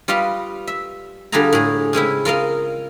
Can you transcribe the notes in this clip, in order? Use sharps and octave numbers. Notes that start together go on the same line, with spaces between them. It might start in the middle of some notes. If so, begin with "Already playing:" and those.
G3 F4 B4 D#5 F5
E5
D3 G3 F4 G#4 F5 A#5
A2 G#4
C#3 G#3 C4 E4
F4 A#4 D#5 F5